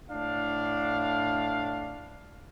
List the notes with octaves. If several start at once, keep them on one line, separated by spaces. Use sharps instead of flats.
A2 D4 F5